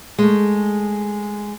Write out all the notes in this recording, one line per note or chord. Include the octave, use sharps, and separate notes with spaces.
G#3 A3